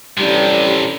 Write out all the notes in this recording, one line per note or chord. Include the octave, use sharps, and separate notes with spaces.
A1 G2 C3 F3 G3